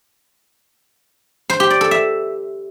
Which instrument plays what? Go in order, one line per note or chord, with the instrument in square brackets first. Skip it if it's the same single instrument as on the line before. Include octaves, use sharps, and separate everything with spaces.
[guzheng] C5
G4
D5
A4
E5